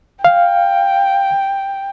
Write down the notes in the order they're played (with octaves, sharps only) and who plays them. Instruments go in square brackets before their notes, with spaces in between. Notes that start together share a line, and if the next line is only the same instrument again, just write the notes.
[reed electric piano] F5 [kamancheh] G5